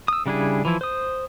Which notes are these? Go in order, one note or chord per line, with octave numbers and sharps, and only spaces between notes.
D#6 E6
C#3 G3 D4 E4 G#4
E3 F3 E4
C5 D#6